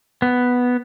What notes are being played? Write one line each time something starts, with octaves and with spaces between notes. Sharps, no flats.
B3